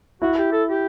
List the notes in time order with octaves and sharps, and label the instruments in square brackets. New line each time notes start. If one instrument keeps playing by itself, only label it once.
[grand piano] E4 [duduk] F#4
[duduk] G4
A4
G4